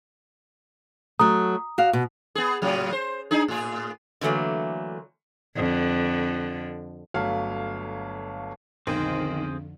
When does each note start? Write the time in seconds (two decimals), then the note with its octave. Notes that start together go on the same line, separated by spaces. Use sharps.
1.19 F#3 A3 A#5 D#6
1.78 F#4 D5 F5
1.93 B2
2.35 B3 G#4
2.62 A2 C#3 F#3
2.92 C5
3.31 D4 D#4 G#4
3.48 A2 G#4
4.21 D3 E3 F#3 A3 A#3
5.56 F2 D3
7.14 G1 F#3 A3 C#5 F5 F6
8.87 B1 F2 D3 D#3 C4 G#4 C5